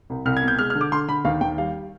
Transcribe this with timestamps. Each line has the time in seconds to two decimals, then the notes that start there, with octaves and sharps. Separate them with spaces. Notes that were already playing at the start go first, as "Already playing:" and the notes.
0.10 C2
0.26 C2 F6
0.37 G#6
0.42 B2
0.48 G6
0.59 G#3 F6
0.70 F6
0.75 D3
0.81 D6
0.92 D3 C6
1.08 D3 B5
1.25 D#2 F5
1.41 D#2 G5
1.58 G3 F5